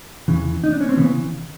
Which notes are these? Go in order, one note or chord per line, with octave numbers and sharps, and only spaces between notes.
E2 C#3 E3
D#4
D4
C#4
C4
C#3 E3 B3